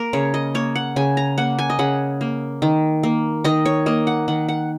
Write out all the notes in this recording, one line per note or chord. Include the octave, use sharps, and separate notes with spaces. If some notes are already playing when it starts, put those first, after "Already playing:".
Already playing: A#3 A#4
C#3 C#5
D#5
A#3 C#5
F#5
C#3 G#5
A#5
A#3 F#5
G#5
D#5
C#3 F#5
A#3
D#3
A#3
D#3 D#5
C#5
A#3 D#5
F#5
D#3 F#5
F#5